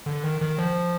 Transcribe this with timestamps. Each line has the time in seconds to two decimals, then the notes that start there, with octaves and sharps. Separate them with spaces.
0.06 D3
0.24 D#3
0.41 D#3
0.58 F3